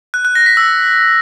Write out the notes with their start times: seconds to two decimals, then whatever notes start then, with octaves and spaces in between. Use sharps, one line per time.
0.14 F#6
0.25 F#6
0.35 A#6
0.46 B6
0.57 E6